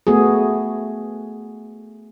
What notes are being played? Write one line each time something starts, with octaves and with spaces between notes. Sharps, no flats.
A3 B3 F#4 G#4